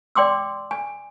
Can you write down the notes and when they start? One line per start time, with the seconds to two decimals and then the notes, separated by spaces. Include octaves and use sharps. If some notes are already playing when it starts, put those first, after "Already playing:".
0.15 D5 G5 C6 D6 E6
0.71 G#5